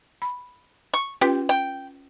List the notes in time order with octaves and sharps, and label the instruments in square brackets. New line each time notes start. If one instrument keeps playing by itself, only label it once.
[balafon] B5
[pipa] C#6
[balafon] C#4 F4 B4 [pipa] G4
[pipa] G5